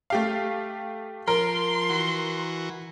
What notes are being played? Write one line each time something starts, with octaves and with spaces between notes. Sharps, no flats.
A3 G4 F5
F3 A#4 C6
E3 F#4